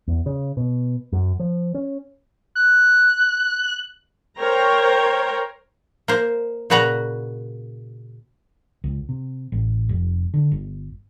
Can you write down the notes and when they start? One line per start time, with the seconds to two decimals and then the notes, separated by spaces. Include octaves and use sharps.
0.08 E2
0.26 C#3
0.57 B2
1.13 F#2
1.40 F3
1.74 C#4
2.55 F#6
4.39 A#4 C5 C#5 G5 A#5
6.08 A#3 C5
6.70 A#2 C#3 F#4 B4 A#5
8.84 C#2
9.09 C3
9.52 A1
9.89 F1
10.34 D3
10.52 G1